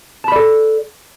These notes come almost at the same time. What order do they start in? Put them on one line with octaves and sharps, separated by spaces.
A5 B5 D5 A4